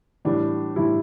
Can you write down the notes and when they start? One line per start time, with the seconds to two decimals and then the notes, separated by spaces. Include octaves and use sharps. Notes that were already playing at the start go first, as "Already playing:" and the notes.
0.25 A2 E3 G3 D4
0.76 A2 E3 G3 E4